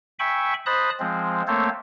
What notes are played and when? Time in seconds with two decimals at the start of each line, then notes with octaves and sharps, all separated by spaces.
0.19 E5 G5 G#5 B5 C#6
0.66 C5 D#5 A5 B5 D#6 F#6
1.00 F3 G#3 C4
1.48 A3 A#3 C4 A4 C5 C#5